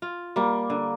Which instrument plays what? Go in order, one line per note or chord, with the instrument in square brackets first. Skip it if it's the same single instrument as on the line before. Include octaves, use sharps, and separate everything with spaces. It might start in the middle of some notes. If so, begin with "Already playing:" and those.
[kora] F4
[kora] G3 [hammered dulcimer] A#3
[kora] D3